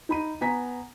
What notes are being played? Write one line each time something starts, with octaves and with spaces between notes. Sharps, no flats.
D#4 B5 D#7
B3 G#5 A#5 B6